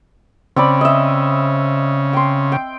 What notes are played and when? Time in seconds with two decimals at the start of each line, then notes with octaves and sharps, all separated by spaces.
0.56 C#3 C4 D5 B5
0.81 D#5 E5
2.13 G5 C6
2.52 G5